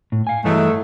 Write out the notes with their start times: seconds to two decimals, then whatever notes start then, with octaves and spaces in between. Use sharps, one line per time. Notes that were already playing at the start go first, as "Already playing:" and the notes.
0.12 A2
0.27 F5 G#5
0.44 G2 E3 F#3 G#3 A3